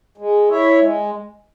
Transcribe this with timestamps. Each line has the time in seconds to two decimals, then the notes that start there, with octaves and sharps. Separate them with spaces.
0.18 G#3
0.49 E4 C#5 E5
0.79 G#3